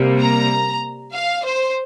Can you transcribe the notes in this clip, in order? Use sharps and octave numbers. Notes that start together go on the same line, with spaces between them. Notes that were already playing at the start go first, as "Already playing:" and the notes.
Already playing: C3 G3 A#3
A#5
F5
C5